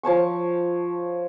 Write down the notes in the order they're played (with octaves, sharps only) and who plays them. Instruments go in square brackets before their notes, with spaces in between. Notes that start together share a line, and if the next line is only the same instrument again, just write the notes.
[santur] F3 C#5 A5 C#6